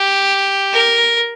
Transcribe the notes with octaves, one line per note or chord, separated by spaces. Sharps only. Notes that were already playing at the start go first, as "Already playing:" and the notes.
Already playing: G4
A#4